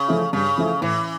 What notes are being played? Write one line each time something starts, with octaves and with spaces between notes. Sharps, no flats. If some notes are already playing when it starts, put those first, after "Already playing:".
Already playing: C#3
F3 A3 E4
G2 C#3
F3 A3 E4
A2 E3